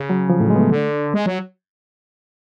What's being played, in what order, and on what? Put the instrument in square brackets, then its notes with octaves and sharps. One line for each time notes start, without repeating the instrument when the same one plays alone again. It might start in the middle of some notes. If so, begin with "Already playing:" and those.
Already playing: [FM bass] C#3
[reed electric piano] F#3
F3
A2
F#3
G#3
B3
A3
[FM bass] D3
G#3
F#3